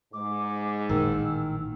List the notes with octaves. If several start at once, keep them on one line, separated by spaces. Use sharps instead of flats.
G#2 D6
A1 A#2 D#3 A#3 E6